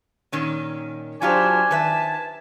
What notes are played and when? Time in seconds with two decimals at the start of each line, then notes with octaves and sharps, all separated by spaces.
0.32 A#2 D#3 C#4
1.22 F#3 D4 F4 G4 C5 G#5
1.71 D#3 B4 E5 A5